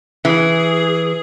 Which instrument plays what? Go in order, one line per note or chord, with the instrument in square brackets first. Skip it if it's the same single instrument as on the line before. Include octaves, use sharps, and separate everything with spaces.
[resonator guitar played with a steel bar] E3 [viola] G#4